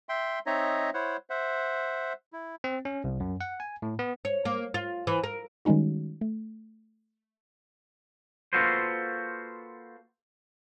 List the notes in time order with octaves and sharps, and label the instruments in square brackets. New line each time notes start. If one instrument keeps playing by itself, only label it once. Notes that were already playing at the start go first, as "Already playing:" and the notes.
[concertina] E5 G5 C6
C4 D#4 C#5 D#5 E5 A#5
E4 C5 C#5 F#5
C5 E5 F#5
E4
[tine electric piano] C4
C#4
C2
F#2
F#5
G#5
A2
B3
[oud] C#5
A#3
F4
E3
A#4
[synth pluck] D#3 G3 G#3 C#4 D#4 F#4
A3
[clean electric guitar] A#3 F4 F#4 A4 B4 C5